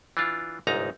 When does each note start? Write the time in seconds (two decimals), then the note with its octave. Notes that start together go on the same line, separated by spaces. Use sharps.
0.17 E3 D4 F4
0.67 G1 C2 G#2 D#4 A#5